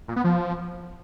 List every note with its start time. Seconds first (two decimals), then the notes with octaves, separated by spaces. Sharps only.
0.08 A#2
0.16 B3
0.24 F3